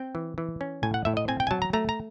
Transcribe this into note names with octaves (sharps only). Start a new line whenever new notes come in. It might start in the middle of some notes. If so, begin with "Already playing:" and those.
Already playing: C4 G5
E3
E3
C#4
A2 G#5
F#5
A2 E5
D#5
C4 G#5
G5
G#5
F#3 A5
A#5
A3 A#5
A#5